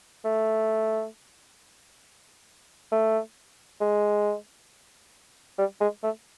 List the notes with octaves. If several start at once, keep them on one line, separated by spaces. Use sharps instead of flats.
A3
A3
G#3
G3
G#3
A3